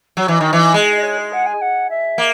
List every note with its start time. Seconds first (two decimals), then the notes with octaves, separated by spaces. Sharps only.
0.17 F#3 C#5
0.28 E3 D#5
0.40 D#3
0.53 E3
0.74 G#3
0.96 D#5
1.02 C#5
1.17 G#4
1.32 F#5
1.46 G#5
1.61 F#5
1.89 E5
2.18 A#3